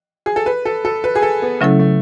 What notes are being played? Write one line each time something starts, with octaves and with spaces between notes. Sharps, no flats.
G#4
A4
B4
A4
A4
B4
G#4
A4
B3
C#3 F#3 A3 C#4 E4 A4
A3